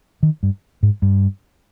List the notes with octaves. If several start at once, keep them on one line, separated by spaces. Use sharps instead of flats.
D#3
G2
G#2
G2